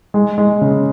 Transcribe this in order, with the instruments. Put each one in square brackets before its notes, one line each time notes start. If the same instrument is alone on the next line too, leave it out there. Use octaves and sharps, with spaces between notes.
[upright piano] G#3
G#3
C#3